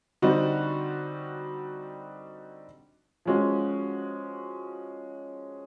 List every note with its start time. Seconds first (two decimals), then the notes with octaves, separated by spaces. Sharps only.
0.22 D3 G3 C4 D#4 F#4
3.26 F3 G#3 C#4 F#4